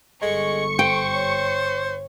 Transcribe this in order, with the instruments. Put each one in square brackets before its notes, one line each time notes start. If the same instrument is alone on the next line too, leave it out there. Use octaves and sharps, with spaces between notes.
[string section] G1 C#6 C#7 [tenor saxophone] G#3 [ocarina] A4
[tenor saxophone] C5 [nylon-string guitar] G5
[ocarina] C#5